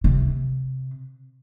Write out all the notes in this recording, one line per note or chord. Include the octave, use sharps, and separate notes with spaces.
C3